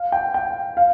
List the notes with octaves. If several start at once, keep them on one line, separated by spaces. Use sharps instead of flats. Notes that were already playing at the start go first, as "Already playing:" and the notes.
Already playing: F5
G5
G5
F5